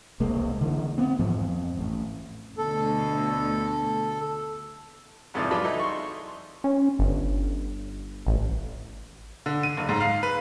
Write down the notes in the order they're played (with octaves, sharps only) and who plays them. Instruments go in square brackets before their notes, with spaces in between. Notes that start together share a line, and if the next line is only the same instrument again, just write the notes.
[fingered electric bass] E1 C2 G#3 A#3
D3 E3
B3 C4
G#2 E3 F3
F2
A1
[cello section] D2 B2 D3 [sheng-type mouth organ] A4
[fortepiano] G#1 F2 C3 E3 D5
E3 F#3 F4 D5 A5 B5
D#4 E4 A4
C6 C#6
[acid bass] C#4
G1
A1
[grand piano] D3
D#7
F#1
G#2
F5
B4